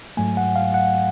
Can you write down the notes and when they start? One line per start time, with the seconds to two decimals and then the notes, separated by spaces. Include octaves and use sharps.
0.17 G#2 F#3 A3 G#5
0.37 F#5
0.56 F5
0.74 F#5